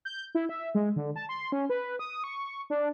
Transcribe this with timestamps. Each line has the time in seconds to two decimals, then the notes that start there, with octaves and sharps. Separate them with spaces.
0.05 G6
0.35 E4
0.49 E5
0.75 G#3
0.96 D3
1.16 A5
1.29 C6
1.52 C#4
1.70 B4
1.99 D#6
2.24 C#6
2.70 D4